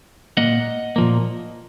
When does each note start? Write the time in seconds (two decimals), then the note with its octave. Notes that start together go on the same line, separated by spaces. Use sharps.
0.37 A#2 F3 A#3 D#5 F#5
0.96 A#2 F3 A#3